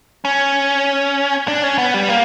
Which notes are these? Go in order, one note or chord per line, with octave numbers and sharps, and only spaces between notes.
C#4
D4
C#4
B3
G3
A#3